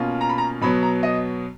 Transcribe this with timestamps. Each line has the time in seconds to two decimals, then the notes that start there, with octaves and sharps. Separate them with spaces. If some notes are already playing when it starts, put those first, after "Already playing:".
Already playing: B2 A#3 C#4 F4
0.21 A#5
0.29 B5
0.38 A#5
0.61 B2 F#3 B3 B5
0.83 A#5
1.03 D#5